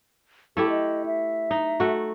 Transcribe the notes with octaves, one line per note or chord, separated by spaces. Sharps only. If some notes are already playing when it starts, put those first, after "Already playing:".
A3 E4 G4 A4
D#5
E5
D#4
A3 F#4